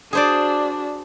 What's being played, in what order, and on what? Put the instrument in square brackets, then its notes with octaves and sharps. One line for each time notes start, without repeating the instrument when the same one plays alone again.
[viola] D4 F#4 [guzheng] G#4 C5 D5